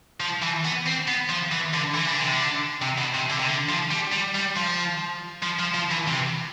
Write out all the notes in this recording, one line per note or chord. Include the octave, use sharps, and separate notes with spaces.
F3
E3
B3
C4
B3
F3
E3
D3
E3
D3
C3
D3
C3
B2
C3
D3
C3
D3
F3
G3
G3
G3
F3
F3
F3
F3
E3
C3